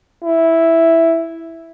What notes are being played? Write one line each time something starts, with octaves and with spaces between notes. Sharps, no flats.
E4